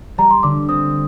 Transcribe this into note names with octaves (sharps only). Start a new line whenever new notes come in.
G3 A#5
C6
D3 D6
C4 D#6